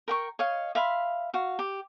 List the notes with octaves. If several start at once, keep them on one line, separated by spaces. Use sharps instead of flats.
A#4 G5 C#6
C#5 D#5 F5
E5 F5 B5 C6
F#4 F5
G4